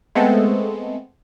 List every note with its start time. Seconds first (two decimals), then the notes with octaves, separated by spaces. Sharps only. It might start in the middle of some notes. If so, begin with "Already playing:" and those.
0.15 G#3 A3 B3 C4 A4